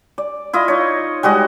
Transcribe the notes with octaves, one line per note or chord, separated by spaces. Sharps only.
D5
E4 F4 D#5
D#4 C#5
G3 G#3 F#4 D#5